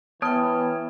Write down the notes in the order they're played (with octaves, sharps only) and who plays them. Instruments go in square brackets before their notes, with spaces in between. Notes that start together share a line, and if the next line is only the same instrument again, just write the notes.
[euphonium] E3 [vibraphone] B3 G5 [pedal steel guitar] C#5 D#6 F6 [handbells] A5